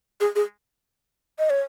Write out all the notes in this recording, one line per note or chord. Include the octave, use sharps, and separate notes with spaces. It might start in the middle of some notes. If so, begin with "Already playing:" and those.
G#4
G#4
D#5
C#5